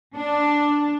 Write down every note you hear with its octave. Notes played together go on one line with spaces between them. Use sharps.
D4